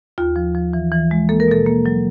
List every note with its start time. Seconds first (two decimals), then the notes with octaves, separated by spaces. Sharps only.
0.18 D#2 F4
0.36 F3
0.55 F3
0.73 E3
0.92 E3
1.11 G#3
1.29 A#3 A4
1.40 A#4
1.48 B2 A4
1.66 A#3
1.86 F#3